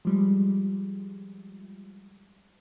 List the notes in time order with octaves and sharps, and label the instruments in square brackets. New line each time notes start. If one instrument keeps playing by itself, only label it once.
[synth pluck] F3 G3 G#3